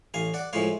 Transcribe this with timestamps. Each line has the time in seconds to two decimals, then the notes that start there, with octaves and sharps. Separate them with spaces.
0.14 A1 F5 G#5
0.34 D5 F#5
0.53 A2 F3 G#3 C#5 F5